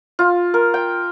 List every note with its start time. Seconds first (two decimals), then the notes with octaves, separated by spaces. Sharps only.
0.19 F4
0.54 A#4
0.74 G5